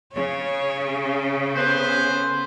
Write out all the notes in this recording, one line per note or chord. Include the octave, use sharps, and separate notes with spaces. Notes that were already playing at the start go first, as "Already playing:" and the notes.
C#3 C#5
B3 C#4 A4 B4 C5